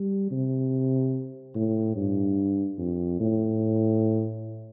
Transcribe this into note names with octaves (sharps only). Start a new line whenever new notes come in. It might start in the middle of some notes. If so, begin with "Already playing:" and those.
Already playing: G3
C3
A2
G2
F2
A2